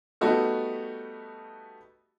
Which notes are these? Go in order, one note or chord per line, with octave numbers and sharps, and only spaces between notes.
G3 A3 B3 D#4 F#4 A4